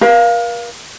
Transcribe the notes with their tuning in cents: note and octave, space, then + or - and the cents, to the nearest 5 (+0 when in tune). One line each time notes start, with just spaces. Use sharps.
A#4 +35 F5 +0